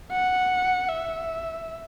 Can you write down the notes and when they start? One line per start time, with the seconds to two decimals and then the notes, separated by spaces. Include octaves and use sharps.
0.12 F#5
0.89 E5